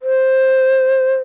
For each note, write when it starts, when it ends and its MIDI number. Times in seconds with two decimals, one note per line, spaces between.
0.02 1.14 72